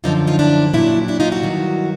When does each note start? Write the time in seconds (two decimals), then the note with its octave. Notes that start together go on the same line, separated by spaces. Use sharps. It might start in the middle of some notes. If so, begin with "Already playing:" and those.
0.04 F#2 D3 F3 D#4 F4
0.27 D#4 F4
0.39 D4 E4
0.74 A#2 F#3 D4 E4
1.08 D4 E4
1.20 D#4 F4
1.32 E4 F#4
1.43 G2 D#3 F#3